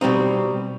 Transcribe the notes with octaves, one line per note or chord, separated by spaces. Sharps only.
B2 G3 C4 D#4